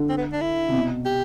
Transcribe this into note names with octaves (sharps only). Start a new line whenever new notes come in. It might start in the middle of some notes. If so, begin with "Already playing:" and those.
Already playing: D3
C4
B3
D4
E4
C3
B2
G4